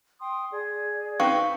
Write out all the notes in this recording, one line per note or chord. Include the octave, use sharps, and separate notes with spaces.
G5 C6 D#6
G#4 D5
C4 D#4 B4 F5 C#6